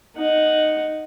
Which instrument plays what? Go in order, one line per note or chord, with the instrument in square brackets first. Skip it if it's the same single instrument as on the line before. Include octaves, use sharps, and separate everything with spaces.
[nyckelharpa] D#4 F#5